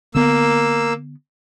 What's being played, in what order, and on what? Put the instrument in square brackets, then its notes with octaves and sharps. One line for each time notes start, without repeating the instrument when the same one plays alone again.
[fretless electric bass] D3 B3 [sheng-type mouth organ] A#3 E6